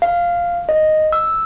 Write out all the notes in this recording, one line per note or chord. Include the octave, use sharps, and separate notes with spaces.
F5
D#5
E6